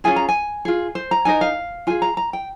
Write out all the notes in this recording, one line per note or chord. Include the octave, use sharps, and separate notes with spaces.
C#4 F4 G#4 G#5
A#5
G#5
F4 G#4
C5
A#5
D#4 A#4 G#5
F5
F4 G#4 G#5
A#5
A#5
G5